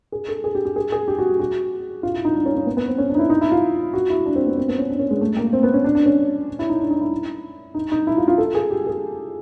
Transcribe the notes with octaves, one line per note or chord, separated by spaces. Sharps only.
G#4
A4
G#4
G4
G4
G#4
G#4
G4
F#4
F#4
F4
E4
D#4
D4
C#4
C#4
B3
B3
C4
C#4
D4
D#4
E4
D#4
E4
F4
F#4
E4
D4
C4
B3
C4
B3
C#4
D4
C#4
G#3
A3
A#3
C4
B3
C#4
D4
D4
C#4
E4
D#4
D4
D#4
E4
D#4
D#4
E4
F4
F4
A4
G#4
G4
G#4